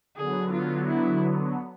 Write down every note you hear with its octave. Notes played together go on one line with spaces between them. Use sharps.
D3 F#3 B3 G#4
F4
E4